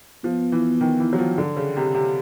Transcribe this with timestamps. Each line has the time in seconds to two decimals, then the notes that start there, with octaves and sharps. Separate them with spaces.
0.24 F3 B3
0.52 E3
0.81 D#3
1.00 E3
1.13 F#3
1.18 F3
1.38 D3
1.57 C#3
1.77 C3
1.94 C3